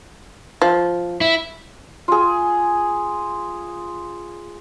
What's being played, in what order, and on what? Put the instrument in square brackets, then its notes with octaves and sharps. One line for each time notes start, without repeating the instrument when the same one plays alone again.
[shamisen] F3
[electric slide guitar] E4
[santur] F4 G#4